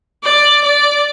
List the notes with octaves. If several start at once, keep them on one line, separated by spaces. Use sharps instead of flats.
D5
D5